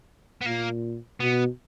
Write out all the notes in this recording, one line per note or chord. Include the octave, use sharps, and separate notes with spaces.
B3
A#2 A#3
B2 B3